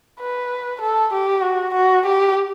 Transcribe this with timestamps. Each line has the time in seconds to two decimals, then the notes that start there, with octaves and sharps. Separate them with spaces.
0.20 B4
0.81 A4
1.13 G4
1.43 F#4
1.74 F#4
2.06 G4